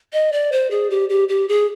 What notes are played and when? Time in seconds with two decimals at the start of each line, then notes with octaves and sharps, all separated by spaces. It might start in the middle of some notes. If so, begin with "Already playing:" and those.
0.13 D#5
0.32 D5
0.52 C5
0.71 G#4
0.90 G4
1.09 G4
1.29 G4
1.49 G#4